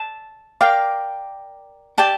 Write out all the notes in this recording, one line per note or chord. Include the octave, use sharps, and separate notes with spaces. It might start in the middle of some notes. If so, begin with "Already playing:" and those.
Already playing: A5
A#4 D5 F5 G5 D6
G4 D5 G5 A5 D6